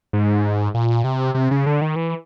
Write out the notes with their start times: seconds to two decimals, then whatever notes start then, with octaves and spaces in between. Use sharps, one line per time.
0.13 G#2
0.74 A#2
1.04 C3
1.35 C3
1.51 C#3
1.66 D3
1.81 D#3
1.96 E3